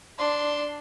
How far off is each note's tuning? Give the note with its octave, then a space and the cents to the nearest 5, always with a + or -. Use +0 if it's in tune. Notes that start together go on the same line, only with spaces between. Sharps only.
D4 +0 C6 +0